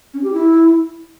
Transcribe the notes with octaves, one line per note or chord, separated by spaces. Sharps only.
C#4
G4
E4